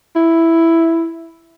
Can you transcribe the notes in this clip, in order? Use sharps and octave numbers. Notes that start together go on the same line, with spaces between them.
E4